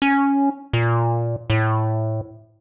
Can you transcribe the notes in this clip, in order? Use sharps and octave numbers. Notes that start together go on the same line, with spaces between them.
C#4
A#2
A2